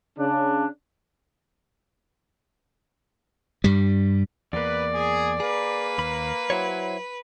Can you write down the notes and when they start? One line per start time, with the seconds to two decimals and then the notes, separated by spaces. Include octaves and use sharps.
0.19 C#3 D4
3.64 G2 G3
4.53 E2 A#3 B4 D5
4.95 G#4
5.40 A#3 G#4 B4
5.98 D#2 B5
6.50 F#3 E4 C5 C#5